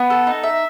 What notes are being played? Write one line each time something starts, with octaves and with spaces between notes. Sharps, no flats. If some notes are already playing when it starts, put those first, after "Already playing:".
Already playing: B3
A4
D#4
E5